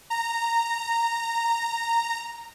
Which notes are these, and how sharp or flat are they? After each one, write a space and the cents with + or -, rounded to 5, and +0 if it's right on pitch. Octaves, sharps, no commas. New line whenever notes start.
A#5 -10